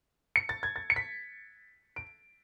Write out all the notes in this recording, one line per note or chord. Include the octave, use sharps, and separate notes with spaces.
C#7
A6
G#6
A6
C#7
B6
D7